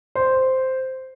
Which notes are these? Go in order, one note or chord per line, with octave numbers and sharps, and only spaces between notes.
C5